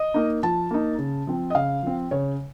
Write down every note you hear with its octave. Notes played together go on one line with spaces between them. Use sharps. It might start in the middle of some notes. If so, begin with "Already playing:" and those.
Already playing: D#5
A#3 D#4
F3 A5
A#3 D#4
C#3
F3 C4
D#5
C#3 F5
F3 C4
C#3 C#5